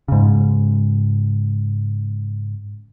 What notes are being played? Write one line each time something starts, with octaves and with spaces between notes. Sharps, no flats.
G#2 C#3